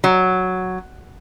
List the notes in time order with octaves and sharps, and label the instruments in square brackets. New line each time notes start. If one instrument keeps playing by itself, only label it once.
[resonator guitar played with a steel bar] F#3